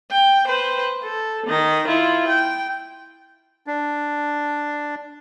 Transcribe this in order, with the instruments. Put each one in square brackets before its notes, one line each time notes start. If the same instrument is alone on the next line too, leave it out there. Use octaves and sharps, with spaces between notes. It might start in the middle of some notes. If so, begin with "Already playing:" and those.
[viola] G5
B4 C5
A4
D#3 D#5
E4 F4
G5
[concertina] D4